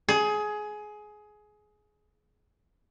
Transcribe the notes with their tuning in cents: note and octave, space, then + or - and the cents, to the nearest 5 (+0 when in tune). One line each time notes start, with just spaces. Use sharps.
G#4 +20